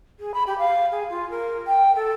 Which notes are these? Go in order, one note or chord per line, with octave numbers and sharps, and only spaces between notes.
G#4
B5
G4
F5
G#4
F4
A#4
G5
A4